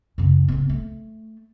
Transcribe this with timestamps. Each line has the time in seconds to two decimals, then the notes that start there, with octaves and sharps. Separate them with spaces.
0.18 F#2 C#3
0.48 C#3 B3
0.69 A3